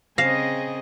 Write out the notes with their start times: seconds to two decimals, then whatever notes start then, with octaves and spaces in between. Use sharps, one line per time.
0.18 C#3 C4 G#4 D#5 F5 A#6 E7